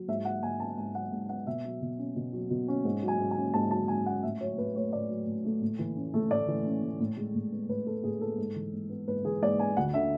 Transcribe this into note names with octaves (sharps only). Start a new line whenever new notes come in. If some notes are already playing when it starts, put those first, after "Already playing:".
Already playing: F#3
G#2 E5
F#3 F#5
G#2 G#5
B3 A5
G#2 G#5
F#3 F#5
G#2
B3 F#5
B2 E5
F#3
B2
C#4
B2
F#3
B2
C#4
G#2
F#3
G#5
G#2
G#5
C#4
G#2 A5
F#3 A5
G#2 G#5
C#4 F#5
A2 E5
F#3 C#5
A2 B4
A3 C#5
A2 D5
F#3
A2
A3
A2
E3
C#4
A3
A2 D5
E3
C#4
A3
A2
G#3
A2
B3
A2 B4
G#3 A4
A2 G#4
B3 A4
G#2
E3
G#2
B3
G#2 B4
E3 G#4
G#2 D5
B3 G#5
D2 F#5
D3 E5